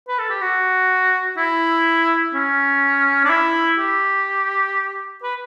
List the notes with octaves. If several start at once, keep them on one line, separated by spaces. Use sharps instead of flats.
B4
A4
G4
F#4
E4
C#4
D4
E4
G4
B4